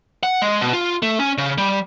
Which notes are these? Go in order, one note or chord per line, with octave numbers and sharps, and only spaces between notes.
F#5
G#3
B2
F4
A3
C#4
C#3
G3